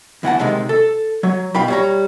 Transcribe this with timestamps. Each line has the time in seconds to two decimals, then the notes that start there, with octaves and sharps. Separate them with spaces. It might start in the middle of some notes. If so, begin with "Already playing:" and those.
0.23 E2 E3 F#5 A5
0.40 C3 D#3 G#3
0.69 A4
1.23 F#3 C#5
1.55 B2 F4 G5 B5
1.68 G3 C#5 A#5